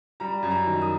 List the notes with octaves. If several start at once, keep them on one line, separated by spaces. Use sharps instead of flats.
G3 A#5
F#2
A#5
D#3
D#6